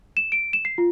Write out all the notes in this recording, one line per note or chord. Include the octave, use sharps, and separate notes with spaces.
E7
D7
E7
C7
F4